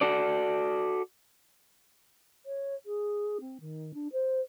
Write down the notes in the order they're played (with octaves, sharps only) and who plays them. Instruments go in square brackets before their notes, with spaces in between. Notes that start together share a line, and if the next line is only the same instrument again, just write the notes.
[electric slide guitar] F#4 A4 D5
[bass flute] C#5
G#4
C4
D#3
D4
C5